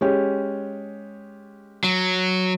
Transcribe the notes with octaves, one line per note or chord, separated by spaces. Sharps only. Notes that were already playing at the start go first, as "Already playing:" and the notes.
G#3 C#4 G4
F#3